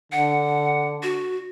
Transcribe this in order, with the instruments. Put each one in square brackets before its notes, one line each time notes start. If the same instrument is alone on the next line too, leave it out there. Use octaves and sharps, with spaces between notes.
[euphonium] D3 [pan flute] F#5
[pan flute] F#4